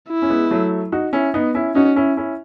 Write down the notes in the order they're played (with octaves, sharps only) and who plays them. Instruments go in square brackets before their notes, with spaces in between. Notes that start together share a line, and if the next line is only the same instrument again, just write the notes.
[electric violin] E4
[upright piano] C#4
G#3 B3
F#3 A3
D#4 F#4
C#4 E4
B3 D#4
C#4 E4
[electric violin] C#4 [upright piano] D#4 F#4
[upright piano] C#4 E4
C#4 E4